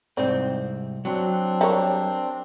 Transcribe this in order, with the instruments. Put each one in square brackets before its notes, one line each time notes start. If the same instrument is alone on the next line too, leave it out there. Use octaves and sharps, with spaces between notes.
[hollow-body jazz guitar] C2 G#2 C4 [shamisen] D#4 D5
[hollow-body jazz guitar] F#3 [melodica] C4 D4
[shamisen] G3 A#4 C#5